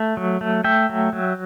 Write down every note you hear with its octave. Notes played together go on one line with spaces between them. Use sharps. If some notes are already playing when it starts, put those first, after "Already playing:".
Already playing: A3
F#3
A3
A3 E5 G5
F#3
F#3